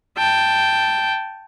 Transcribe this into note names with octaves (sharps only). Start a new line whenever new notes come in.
G5 A5